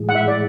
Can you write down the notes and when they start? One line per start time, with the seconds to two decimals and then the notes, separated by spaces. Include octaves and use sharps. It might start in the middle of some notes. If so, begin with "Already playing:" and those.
Already playing: A2 E3 G#3
0.09 F#5
0.15 E5
0.28 D5